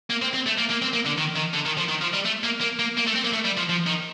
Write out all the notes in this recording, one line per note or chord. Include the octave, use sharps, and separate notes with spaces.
A#3
C4
C4
A3
A#3
A#3
C4
A#3
D3
D#3
D#3
D3
D#3
F3
D#3
F3
G3
A3
A#3
A#3
A#3
A#3
A3
C4
A#3
A3
G3
F3
F3
D#3